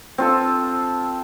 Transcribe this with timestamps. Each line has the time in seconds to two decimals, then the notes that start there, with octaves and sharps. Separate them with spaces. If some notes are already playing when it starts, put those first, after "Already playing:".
0.18 C4 F4 A4